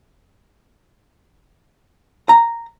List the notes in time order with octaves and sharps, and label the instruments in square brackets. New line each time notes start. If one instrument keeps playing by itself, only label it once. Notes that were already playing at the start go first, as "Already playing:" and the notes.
[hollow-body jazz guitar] A#5